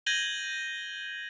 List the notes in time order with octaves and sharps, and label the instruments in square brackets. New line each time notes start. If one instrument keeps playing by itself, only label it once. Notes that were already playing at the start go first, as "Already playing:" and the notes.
[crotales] G6 G#6 A#6 D#7 F#7 G7